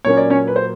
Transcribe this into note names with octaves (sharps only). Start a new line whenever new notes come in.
A#2 F#3 A#3 C#4 C#5
D5
C#4 C#5
B4
C5